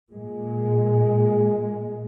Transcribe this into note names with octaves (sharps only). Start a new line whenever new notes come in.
A#2 G#3